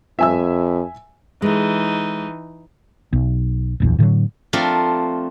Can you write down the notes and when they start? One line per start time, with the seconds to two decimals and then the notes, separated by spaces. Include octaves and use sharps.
0.19 F2 E5 G#5 E6
1.42 E3 G#3 D#4 A4
3.13 B1
3.80 D1 A#1 E2
3.99 A2 D3 E3 F#3
4.53 F3 A3 C4 D4 F4 A#4